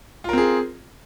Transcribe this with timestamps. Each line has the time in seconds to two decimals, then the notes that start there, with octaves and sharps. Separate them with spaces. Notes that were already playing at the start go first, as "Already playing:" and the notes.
0.24 F4
0.29 A#4
0.33 C4
0.38 G#4